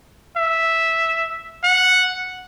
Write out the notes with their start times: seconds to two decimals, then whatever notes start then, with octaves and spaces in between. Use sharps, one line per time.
0.37 E5
1.64 F#5